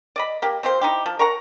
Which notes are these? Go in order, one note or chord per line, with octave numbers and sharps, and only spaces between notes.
D5 D#5 B5
A#3 G4
C4 F4 G4 C5
D#4 E4 G4
F3
A#4 C#5 F#5 A#5